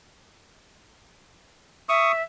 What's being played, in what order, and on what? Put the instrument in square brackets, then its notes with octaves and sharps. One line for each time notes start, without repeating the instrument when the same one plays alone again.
[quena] E5 [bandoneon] C#6 D#6